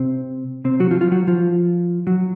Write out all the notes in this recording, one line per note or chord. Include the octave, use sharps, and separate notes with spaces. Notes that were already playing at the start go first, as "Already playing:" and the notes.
Already playing: C3 C4
C3 C4
F#3 F#4
F3 F4
F3 F4
F#3 F#4
F3 F4
F#3 F#4